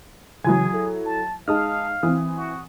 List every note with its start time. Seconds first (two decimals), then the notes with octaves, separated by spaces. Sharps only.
0.44 C#3 E3 F#3 E4 G#4 G#5 G#6
0.74 A4
1.05 A5
1.48 G#3 D#4 F5 A5 D#6 F6
2.03 E3 C4 D#6
2.37 F#4